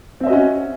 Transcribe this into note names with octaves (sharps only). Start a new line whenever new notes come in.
C4 C#4 F#4 D#5 E5